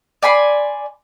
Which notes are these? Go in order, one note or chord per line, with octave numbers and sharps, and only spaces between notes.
D5 G#5 B5 C6